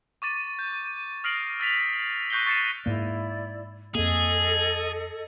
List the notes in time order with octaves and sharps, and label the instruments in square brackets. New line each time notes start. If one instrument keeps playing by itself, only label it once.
[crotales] C#6 D6 A6 D#7
G6
D#6 F6 A#6 C7 D7 F#7
E6 A6 B6 F7
C#6 F#6 G6 A#6 C7 G7
C#6 A6 C7 C#7 D#7 E7
[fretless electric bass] G#2 A#3 [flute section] E4 D5
[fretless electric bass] F2 A#3 [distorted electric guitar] G#4 [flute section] A4 D#5